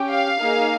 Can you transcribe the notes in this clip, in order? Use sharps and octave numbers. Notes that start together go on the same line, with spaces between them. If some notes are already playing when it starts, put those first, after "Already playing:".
Already playing: C#4 G4
F5
A#3 D#4 G#4